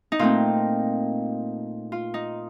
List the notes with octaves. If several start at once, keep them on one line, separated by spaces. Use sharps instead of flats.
D#4
A#2 A3 C4 F4
F4
D#4